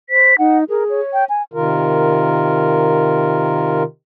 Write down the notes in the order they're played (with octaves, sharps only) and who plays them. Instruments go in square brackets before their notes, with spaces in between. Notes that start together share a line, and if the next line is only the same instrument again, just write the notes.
[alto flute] C5 [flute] B6
[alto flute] D#4 [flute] F#5
[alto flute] G#4 [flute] A#4
[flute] C#5
[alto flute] G5
G#5
[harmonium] C3 D#3 F4 A#4